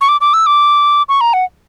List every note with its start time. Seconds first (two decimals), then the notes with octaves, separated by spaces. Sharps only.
0.01 C#6
0.08 D6
0.21 D6
0.33 E6
0.46 D6
1.09 C#6
1.21 A#5
1.33 F#5